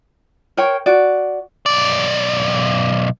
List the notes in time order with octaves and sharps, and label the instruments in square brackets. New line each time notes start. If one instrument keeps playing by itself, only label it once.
[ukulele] A#4 C5 C#5 G5
F#4 D5
[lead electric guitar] B1 D5